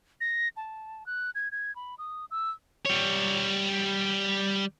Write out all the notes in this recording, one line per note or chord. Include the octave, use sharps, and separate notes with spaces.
A#6
A5
F#6
G#6
G#6
B5
D#6
E6
G3 C#5